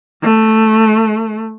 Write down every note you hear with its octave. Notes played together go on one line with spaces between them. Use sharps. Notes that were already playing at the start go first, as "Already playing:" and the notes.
A3